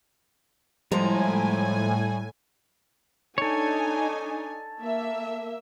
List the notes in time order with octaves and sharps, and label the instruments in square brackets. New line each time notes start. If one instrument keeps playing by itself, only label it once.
[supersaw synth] A2 G#5 [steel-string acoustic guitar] F3 G#3 A#5 [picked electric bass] G3
[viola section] D4 D#4 G#5 [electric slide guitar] A4 C#5
[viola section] A#3 E5